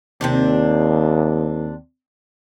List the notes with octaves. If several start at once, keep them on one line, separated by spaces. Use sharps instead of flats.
D#2 C3 C4 D4